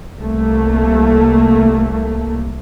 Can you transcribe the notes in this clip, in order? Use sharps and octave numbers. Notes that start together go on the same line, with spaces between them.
C2 A3 A#3